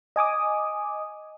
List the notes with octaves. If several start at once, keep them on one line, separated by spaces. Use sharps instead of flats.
D#5 G#5 D6 D#6